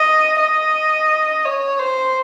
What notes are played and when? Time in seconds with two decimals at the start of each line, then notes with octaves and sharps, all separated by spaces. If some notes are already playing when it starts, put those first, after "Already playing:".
Already playing: D#5
0.40 D#5
1.45 C#5
1.79 C5